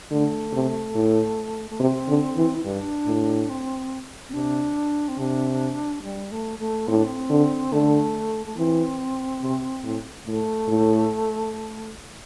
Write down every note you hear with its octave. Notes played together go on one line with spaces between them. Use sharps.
D3 A3
C3
A2
A3
C3 C4
D3
E3
E4
G2 D4
A2
C4
C4
C3 D4
C4
C3 D4
G3
A3
A3
A2 C4
D4
C4
D3
D3 A3
A3
E3 C4
C3
A2
A2 A3
A2